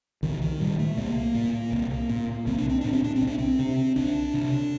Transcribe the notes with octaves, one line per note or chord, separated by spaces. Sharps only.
C2 D#3
D#3
A#2 G3
A3
C2 A#3
A#2
C2
A#2
C2 C4
D4
C4
A#2 D4
C4
D4
C4
C2
D4
C4
C3
C2 D4
C3